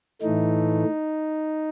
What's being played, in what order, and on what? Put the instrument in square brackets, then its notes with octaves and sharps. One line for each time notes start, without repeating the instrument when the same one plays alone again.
[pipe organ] A2 E3 A3 D#4